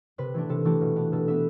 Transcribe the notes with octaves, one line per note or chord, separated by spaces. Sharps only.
C3 B4
E3 A3 D4
C3 A4
E3 A3 D4 G4
B2
B3 D4
B2 A4
B3 D4 E5